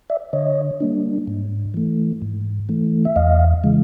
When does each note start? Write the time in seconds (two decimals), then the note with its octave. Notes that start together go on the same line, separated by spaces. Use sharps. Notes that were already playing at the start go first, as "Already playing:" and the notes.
0.10 D5 E5
0.33 D3 C#5 D#5
0.80 G3 A#3 D4
1.27 G#2
1.74 E3 A3
2.22 G#2
2.69 E3 A3
3.05 E5
3.16 E2 D#5 F5
3.64 C#3 E3 G#3